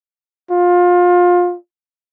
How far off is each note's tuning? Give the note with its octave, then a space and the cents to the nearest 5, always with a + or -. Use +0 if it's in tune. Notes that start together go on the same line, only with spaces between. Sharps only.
F4 +25